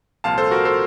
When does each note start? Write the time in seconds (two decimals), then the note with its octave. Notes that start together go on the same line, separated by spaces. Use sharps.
0.24 C2 A#2 F3 F5 A5
0.38 A4 C5
0.51 F#4 A#4
0.65 A4 C5